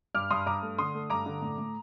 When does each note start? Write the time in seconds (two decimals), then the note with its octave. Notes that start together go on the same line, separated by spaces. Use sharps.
0.15 G2 D6 F6
0.31 G2 C6 D#6
0.46 G2 A#5 D6
0.62 A3
0.78 D3 C6 D#6
0.94 A3
1.10 G2 A#5 D6
1.26 D3
1.42 A2
1.58 A2